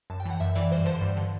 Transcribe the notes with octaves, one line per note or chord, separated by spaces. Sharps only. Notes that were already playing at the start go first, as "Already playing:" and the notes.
F#2 A5
G5
E3 F#5
F#2 E5
E3 D5
G2 C5
D3 C5
G2
D3